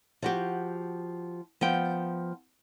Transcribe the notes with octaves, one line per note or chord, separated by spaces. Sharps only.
F3 F#4 G4
F3 B3 G5